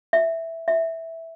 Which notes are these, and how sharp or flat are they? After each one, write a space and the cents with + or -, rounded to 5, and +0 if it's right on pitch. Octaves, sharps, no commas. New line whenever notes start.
E5 +0
E5 -5